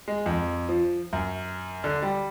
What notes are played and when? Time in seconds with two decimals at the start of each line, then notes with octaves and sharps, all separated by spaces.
0.08 G#3
0.26 F2
0.69 F3
1.13 F#2
1.84 D3
2.02 G3